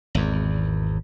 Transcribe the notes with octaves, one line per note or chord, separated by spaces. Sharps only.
G#1 E2